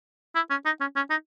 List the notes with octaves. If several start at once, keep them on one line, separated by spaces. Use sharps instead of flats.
E4
C#4
D#4
C#4
C#4
D#4